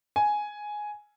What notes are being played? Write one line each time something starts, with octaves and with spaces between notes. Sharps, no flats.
G#5